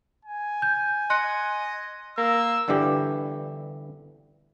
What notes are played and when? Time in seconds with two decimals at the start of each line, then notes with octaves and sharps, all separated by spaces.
0.25 G#5
0.62 G6
1.10 D#5 C6 F#6 C#7
2.18 A#3 E6
2.68 G1 G2 D3 E3 G4